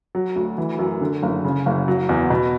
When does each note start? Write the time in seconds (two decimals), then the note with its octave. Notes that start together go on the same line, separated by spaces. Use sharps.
0.15 F#3
0.36 D2
0.58 E3
0.79 F#2
1.01 D3
1.23 F#1
1.44 C#3
1.66 F#1
1.88 F#3
2.09 E2
2.30 B2